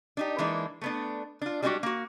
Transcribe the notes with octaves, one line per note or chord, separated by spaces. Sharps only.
D4 D#4 G4
E3 G#3 A#3 D4 D#4
A3 B3 D4
D4 F4
G3 G#3 C4 D4 F#4 G4
A#3 F#4